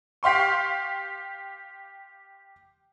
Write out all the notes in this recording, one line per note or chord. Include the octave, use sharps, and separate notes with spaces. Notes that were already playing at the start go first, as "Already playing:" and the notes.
G4 F5 C6 C#6